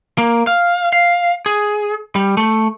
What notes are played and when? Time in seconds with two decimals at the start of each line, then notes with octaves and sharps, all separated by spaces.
0.18 A#3
0.47 F5
0.93 F5
1.46 G#4
2.15 G3
2.37 A3